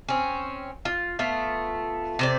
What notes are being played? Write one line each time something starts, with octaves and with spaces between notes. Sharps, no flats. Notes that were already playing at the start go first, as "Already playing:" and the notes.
C4 C#4
F4
A3 B3 F4
C3 C5 D5